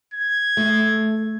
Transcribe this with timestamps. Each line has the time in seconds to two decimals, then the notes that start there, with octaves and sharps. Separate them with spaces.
0.14 G#6
0.57 A3